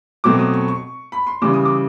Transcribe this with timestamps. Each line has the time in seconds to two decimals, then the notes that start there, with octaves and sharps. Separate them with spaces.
0.24 B2 F#3 A3 C4 D6
0.39 D#6
0.53 C#6
0.68 C#6
1.12 B5
1.27 C6
1.42 C#3 E3 G3 D6
1.54 D#6
1.65 D6